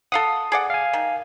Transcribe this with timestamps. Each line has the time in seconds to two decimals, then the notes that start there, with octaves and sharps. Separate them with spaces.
0.12 A4 F5 F#5 D#6
0.52 G#4 D5 F#5
0.70 F5 G#5
0.93 D#3